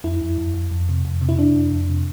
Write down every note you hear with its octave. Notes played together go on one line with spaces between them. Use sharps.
F2 E4
F2
F2
F2
F2
C3
F2
C3
E4
C3 D4
F2
F2
C3